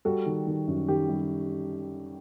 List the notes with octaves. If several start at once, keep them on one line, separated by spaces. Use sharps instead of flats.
G3 F#4 A4
D#3
D#3
F#2
D#3 G4
G3